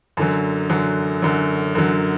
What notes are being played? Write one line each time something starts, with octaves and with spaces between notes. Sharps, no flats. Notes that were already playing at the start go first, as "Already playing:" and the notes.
F#2 D3 F#3
F#2 D3 F#3
F#2 D3 F#3
F#2 D3 F#3